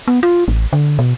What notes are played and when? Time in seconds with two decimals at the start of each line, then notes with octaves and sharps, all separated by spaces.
0.08 B3
0.23 F4
0.48 A1
0.73 D3
0.99 B2